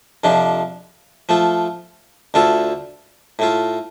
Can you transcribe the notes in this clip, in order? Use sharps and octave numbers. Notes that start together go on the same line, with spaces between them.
F2 C3 F3 D4
F3 A3 F4
D2 D3 A3 F4 A4
A2 A3 F4